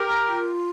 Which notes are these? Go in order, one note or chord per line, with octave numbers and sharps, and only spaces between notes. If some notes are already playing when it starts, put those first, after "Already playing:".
Already playing: G4 A#4
F4